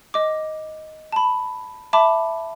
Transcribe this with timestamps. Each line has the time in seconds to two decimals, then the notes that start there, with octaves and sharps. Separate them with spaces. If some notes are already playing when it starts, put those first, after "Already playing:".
0.14 D#5 D6
1.12 A5 B5
1.93 E5 A5 B5 D6